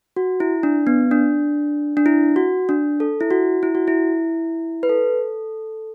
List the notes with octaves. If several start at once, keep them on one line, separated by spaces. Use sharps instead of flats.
F#4
E4
D4
B3
D4
D4
E4
F#4
D4
A4
E4
F#4
E4
F#4
E4
B4
A4